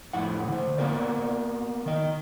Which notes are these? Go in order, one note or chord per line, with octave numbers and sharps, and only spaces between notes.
F2 A2 E4 F#5
D3 C5
A#3 B3 F#4 A#4 D5
D#3 D#5